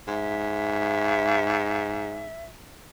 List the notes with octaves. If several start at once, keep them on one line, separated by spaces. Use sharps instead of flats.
G#2 E5